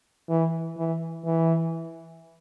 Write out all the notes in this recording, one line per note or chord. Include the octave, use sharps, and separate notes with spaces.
E3
E3
E3